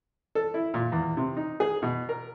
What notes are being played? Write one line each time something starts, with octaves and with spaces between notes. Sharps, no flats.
A4
E4
A#2
E2
C3
D#4
G#4
B2
A#4